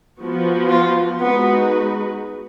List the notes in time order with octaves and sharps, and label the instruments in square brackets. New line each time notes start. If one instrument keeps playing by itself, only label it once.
[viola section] F3 B3 F#4
[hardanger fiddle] F4
[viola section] G#3 D#4 F#4 B4 [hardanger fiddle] B3